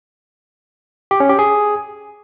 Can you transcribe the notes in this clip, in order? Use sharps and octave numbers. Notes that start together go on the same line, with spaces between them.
G4
C#4
G4
G#4